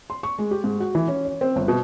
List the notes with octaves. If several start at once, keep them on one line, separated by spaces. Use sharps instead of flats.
C6
C#6
G#3
G4
G#2
F#4
E3
C#4
C#5
C4
G1
B2